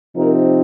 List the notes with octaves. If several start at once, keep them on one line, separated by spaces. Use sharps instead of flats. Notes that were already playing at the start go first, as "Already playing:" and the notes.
C3 F3 C4 D#4 A#4